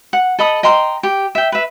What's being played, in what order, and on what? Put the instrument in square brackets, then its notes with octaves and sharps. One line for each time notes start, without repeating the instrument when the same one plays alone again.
[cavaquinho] F#5
A4 D#5 B5 D#6
D#5 G5 A#5 C6
G4
E5 G5
B4 E5